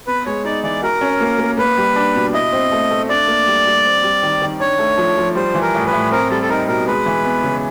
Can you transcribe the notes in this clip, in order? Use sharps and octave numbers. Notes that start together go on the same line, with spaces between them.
B3 B4
G#3 C#5
D#4 D5
E3 D5
F#4 A#4
C#4
A#3
A#3
A#3 B4
G3
D4
B2
E4 D#5
C4
A3
A3
D4 D5
A#3
G3
G3
C4
G3
D#3
D#3
D4 C#5
A3
F3
F3
G3 C5
E3
A#4
A2
B4
A2
C4 A#4
G3 A4
A4
D#4 A#4
B2 A#4
G#3 B4
E3
B3
C#3